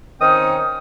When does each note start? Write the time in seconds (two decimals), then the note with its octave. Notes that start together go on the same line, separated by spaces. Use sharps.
0.22 D#3 C4 C#4 D#4 G5 D#6